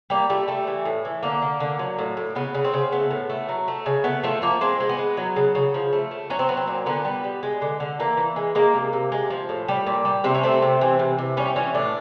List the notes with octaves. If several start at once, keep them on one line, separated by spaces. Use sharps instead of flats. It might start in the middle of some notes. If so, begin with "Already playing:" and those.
G3 A#3
G3 A3
G3 A3
E3
A2
E3
D3 A#3
D3
D3
F#3
A2
A2
C#3 B3
C#3
C4
C#3
A3 B3
A2
A3
F#3
A3
C#3
A3 B3
F3 A3
F3 A#3
G#3 C4
G#3
B3
G#3
F#3
C#3
C#3
F3
A3
A3
F#3 C#4
C4
F#3 B3
C4
A#2
D3 B3
G3
G3
G#3
D3
D3
E3 A#3
E3
G#3
G#3 A#3
C3
C3
G#3
F3
A2
G3
A#2
G3
C3 C4
C#4
A3 C4
C3
E3
C3
C3
G3 C#4
E3 C#4
A2 D4